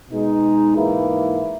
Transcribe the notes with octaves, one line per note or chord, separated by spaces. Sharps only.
B2 G#3 D#4
G#2 E3 A#3 E4